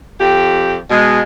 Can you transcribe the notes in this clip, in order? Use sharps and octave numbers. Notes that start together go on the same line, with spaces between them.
F2 G4
B2 G#3